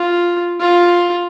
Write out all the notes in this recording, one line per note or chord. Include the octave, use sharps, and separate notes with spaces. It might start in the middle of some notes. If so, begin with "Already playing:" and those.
Already playing: F4
F4